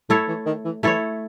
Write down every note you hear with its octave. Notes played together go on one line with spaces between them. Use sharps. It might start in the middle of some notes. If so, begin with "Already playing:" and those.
A2 A3 E4 A4 C#5
E3
D#3
E3
E3 A3 E4 A4 C#5